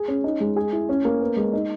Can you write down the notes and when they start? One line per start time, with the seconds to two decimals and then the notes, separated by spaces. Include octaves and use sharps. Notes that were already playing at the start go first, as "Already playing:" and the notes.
Already playing: G#4
0.08 C#4
0.24 D#4
0.40 G#3
0.56 G#4
0.73 E4
0.89 C#4
1.05 A#3
1.21 B3
1.37 G#3
1.53 D#4